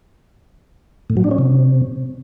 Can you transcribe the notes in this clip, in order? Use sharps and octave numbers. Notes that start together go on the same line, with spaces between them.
A2
F#3
D4
C#4
C3